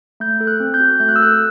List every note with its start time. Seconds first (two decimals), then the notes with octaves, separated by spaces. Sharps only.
0.20 A3 G6
0.40 A4
0.47 F#6
0.60 C4
0.74 G6
0.80 F#4
1.00 A3 G6
1.09 F#6
1.16 E6
1.20 A4 F#6